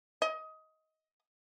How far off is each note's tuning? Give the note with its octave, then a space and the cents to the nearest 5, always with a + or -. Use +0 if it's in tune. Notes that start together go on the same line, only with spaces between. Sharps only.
D#5 +20